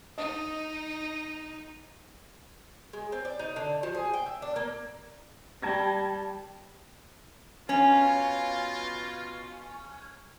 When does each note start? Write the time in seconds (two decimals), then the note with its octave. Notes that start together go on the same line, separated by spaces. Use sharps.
0.18 D#4 D#5
2.93 G#3
3.12 C4
3.25 D5
3.39 D#4
3.56 D3
3.83 F3
3.95 G#4
4.14 G5
4.26 E5
4.42 D4
4.56 A#3
5.62 G3 A5 G#6 A#6
7.69 B2 C#4 F4